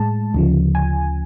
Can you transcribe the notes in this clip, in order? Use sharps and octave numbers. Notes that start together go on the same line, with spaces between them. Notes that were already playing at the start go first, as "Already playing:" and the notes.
Already playing: A2 G#3 A5
D2 C#3 F3
G#5